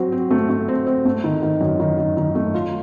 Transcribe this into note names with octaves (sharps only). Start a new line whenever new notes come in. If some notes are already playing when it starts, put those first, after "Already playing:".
Already playing: F#3 C4 F#4
C4
A3
A3
C4
C4
A3
D#3
D#3
F#2
D#3
D#3
D#3
A3
F4